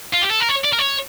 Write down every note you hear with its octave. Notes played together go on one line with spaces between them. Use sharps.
F4
G4
A4
A#4
C#5
D5
A#4
C#5